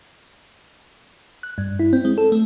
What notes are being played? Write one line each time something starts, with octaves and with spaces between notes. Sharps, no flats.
F#6
G2
E4
C4
G#3
A4
A3